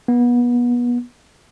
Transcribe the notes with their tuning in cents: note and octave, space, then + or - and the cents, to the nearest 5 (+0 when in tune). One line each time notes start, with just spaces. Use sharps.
B3 -30